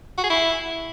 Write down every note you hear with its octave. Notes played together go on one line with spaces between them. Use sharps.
F#4
G#4
E4